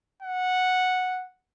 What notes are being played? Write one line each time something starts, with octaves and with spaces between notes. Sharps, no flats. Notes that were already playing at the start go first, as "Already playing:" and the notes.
F#5